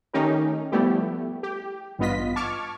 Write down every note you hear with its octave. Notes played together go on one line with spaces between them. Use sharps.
D#3 A3 C#4 D#4 G4 A#4
F3 G3 A3 B3 E4 G4
G4
A1 G2 B3 F4 D#5 B6
A5 C#6 D6 F6 G#6